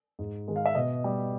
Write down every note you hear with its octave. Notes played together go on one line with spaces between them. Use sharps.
G#2
D#3 G#3
F5
E5
B2 D#5
G3